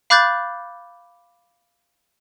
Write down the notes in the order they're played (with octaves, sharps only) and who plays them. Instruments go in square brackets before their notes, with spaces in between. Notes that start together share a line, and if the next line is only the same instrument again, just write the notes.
[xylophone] F5 B5 D6 F#6 G6 A6